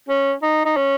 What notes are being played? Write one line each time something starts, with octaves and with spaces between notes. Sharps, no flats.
C#4
D#4
D#4
C#4